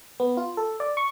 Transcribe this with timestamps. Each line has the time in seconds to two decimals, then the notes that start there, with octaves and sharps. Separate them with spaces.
0.20 B3
0.37 F4
0.57 A4
0.80 D5
0.97 C#6